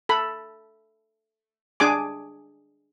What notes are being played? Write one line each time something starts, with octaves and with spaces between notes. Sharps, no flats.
A4 B5
D4 G#4 G#5 D6